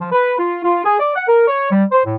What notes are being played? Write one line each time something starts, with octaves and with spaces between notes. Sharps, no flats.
F3
B4
F4
F4
G#4
D5
F#5
A#4
C#5
G3
C5
A2